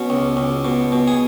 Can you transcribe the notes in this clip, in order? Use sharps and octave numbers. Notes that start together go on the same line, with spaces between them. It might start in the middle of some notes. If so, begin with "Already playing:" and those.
Already playing: B2 C#4
C#2
C#2
B2
B2
G#4